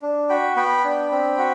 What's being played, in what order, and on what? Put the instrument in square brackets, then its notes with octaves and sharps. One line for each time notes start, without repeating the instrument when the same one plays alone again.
[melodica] D4
F#4 G5 B5
B3 G5 B5
D4
C4
F#4